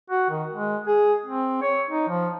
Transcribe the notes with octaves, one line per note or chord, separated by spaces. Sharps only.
F#4
D#3
G#3
G#4
C4
C#5
D#4
F3